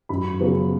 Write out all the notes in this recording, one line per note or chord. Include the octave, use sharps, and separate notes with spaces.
F#2 B5
C#3 F#3 B3